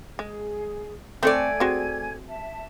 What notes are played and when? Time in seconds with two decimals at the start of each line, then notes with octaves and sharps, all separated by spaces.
0.19 G#3 G#4
1.23 A3 C4 A4 D5 G#5 G#6
1.60 C4 F#4 G#4
2.26 E5 A5